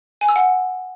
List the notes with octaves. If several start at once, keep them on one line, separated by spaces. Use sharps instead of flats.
G#5
E6
F#5